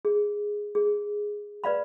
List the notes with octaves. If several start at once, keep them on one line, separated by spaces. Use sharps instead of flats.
G#4
G#4
B4 D5 F5 B5